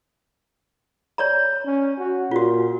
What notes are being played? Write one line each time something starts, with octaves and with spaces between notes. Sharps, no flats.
C#5 D5 A#5
C#4
F#4
A#2 F4 F#4